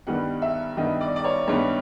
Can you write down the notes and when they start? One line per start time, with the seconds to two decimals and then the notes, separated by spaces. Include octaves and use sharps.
0.07 G2 D#3 G3 B3 F#5
0.42 E5
0.77 G2 D#3 G3 B3 D#5
1.01 D5
1.16 D5
1.24 C#5
1.48 G2 D#3 G3 B3 C#5